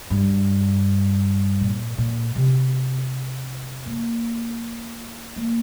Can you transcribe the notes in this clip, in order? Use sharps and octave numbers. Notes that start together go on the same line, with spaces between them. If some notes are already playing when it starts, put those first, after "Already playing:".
G2
A#2
A#2
C3
A#3
A#3